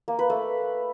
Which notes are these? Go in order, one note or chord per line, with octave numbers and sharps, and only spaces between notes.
A#3
B4
A3